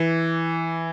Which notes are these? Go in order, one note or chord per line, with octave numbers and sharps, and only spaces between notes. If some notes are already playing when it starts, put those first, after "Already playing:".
Already playing: E3